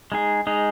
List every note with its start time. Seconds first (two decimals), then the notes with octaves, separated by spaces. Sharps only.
0.12 G#3 D#4 G#4
0.47 G#3 D#4 G#4